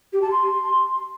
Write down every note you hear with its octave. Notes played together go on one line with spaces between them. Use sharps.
G4
A5
C6